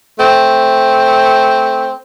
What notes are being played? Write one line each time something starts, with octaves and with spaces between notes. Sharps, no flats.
A3 C4